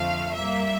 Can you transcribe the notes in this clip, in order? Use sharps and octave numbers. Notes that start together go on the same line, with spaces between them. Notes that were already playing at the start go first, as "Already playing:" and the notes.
Already playing: F2 D3 F3 A3 F5
A#2 G3 A#3 E5